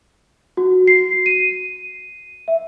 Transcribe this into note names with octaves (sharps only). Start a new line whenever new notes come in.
F#4
C7
D#7
E5